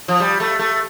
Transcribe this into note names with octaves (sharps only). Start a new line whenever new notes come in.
F3
G3
A3
A3